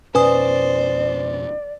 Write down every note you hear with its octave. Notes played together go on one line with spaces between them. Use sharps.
F2 B2 C#4 B4 C5 D5 G#5 D#6